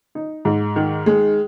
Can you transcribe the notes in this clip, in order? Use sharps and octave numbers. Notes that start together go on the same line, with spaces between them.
D#4
G#2
D#3
G#3